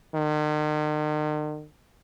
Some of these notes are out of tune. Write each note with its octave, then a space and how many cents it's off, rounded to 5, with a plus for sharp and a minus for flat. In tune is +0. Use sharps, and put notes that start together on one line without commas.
D#3 -45